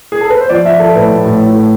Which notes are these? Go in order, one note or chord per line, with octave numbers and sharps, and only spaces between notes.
G#4
A4
B4
C5
F3 D5
F3 E5
F3 A4
A2 B4
A2
A2
A2
A2